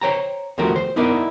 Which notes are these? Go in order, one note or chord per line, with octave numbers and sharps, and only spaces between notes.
C5 C#5 G5 A#5
D#2 F3 A3 F#4 A#4 G5
C5
B3 D#4 E4 A#4 D5 D#5